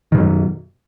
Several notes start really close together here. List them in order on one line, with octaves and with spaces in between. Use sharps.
D#3 B2 F#3 F#2